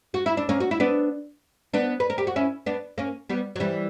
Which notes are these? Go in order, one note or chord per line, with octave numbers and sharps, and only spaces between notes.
F#4
E4
D4
A#3 C#4
F#4
E4
B3 D4
B3 D4
B4
A#4
G4
F#4
C#4 E4
B3 D4
A#3 C#4
G3 B3
F#3
E3 G3